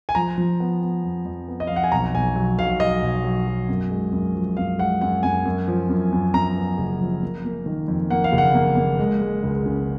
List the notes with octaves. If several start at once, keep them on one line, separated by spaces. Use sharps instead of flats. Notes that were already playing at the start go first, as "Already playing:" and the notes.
G#5
F3 A#5
F3
B3
B3
F2
F2
B3
D#5
F2 F5
F#5
G#5
B1 A#5
B1 G#5
F#3
B1 F5
F#3 D#5
B1
F#3
F#3
F#2
G#3
F#2
F3
F#2 F5
G#3 F#5
F#2 F#5
F#2 G#5
F#2
F3
F#2
F#2
F#2 A#5
B3
F#1
F3
A#3
A#3
D#3
F2
A#3 F#5
F5
F#1
F#5
A#3
A#3
G#3
G#3
C#2
C#3